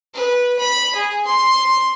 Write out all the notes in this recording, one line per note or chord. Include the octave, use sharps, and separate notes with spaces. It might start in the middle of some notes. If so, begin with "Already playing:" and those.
B4
B5
G#4
C6